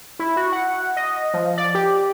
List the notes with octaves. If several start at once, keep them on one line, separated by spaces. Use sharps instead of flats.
E4
F#4
F#5
D#5
F3
D5
G4